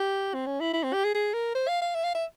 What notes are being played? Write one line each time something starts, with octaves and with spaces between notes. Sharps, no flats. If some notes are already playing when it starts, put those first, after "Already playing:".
Already playing: G4
C4
C#4
E4
E4
C4
G4
G#4
G#4
A#4
C5
F5
F5
E5
F5
E5